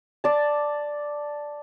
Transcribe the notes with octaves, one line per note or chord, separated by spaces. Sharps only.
D5 A5